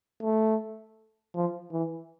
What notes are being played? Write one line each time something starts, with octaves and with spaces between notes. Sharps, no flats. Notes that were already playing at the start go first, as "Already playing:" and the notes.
A3
F3
E3